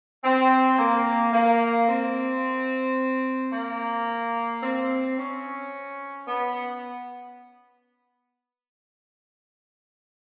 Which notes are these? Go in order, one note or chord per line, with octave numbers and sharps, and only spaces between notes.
C4
A#3
A#3
C4
A#3
C4
C#4
B3